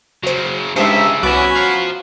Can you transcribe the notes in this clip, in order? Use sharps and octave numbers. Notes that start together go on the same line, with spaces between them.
C#3 F#3 F#4 C5
G2 C#3 G#3 D#4 F4 C5 E5
C2 B3 C#4 F#4 D5 E5
C5 F5 A#5